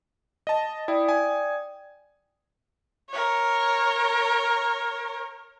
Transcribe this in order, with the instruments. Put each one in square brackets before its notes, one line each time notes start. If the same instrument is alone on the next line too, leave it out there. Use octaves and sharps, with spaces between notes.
[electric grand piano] D#5 A5
[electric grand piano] E4 [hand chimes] D5 G5 D#6
[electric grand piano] G#5
[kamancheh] A#4 C#5